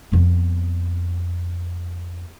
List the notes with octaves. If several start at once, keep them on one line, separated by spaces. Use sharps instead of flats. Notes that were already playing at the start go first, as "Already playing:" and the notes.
F2 B3